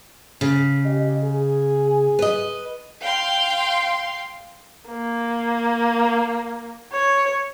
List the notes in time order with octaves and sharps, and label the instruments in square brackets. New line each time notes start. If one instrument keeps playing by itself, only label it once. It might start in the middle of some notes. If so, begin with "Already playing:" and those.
[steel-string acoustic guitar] C#3
[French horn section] G4 D#5
G#4
[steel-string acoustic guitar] B4 D#5
[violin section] F5 G5 C6
[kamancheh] A#3
C#5